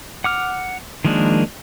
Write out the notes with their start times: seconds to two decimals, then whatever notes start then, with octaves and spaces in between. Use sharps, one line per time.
0.24 F#5 D6 F6
1.05 D#3 F3 G#3 A#3 D4